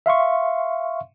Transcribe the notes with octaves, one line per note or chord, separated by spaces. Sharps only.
E5 F5 C6 C#6